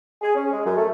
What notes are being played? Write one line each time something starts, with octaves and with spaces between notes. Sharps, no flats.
G#4
C#4
G#3
F#2
A3